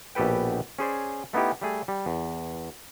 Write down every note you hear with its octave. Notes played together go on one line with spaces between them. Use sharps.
A#1 B2 G4 A4 B4 G5
C#4 G#4 C5 D5
A3 B3 D#4 E4 G4
G3 A3 G#4
G3
E2